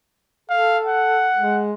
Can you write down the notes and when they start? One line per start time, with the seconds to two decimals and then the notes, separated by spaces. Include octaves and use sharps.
0.50 A4 F5
0.87 F#5
1.35 G#3